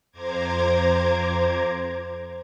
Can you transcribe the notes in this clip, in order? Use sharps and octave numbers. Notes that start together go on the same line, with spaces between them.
F2 C5 A#5 D6 G#6